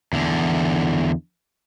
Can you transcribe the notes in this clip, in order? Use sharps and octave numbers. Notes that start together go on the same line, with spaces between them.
E2 D3